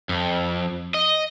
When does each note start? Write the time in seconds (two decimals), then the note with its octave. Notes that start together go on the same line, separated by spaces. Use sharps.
0.09 F2
0.94 D#5